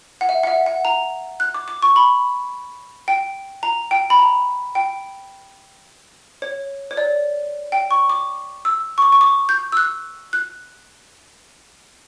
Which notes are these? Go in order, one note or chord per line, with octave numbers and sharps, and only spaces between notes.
F#5
E5
F#5
E5
F#5
A#5
F#6
D6
D6
C#6
B5
G5
A#5
G5
B5
A#5
G5
C#5
C#5
D5
G5
C#6
D6
E6
C#6
D6
C#6
D6
G6
E6
F#6
F#6